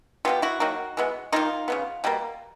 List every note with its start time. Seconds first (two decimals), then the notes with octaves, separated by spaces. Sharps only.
0.25 B2 G#3 B3 F4 G4
0.42 E4 F#4
0.60 D#3 F#3 A#3
0.97 E3 G#3 B3
1.32 D#3 G3 A#3 D#4 F4
1.68 C#3 F#3 B3
2.04 B2 G3 A#3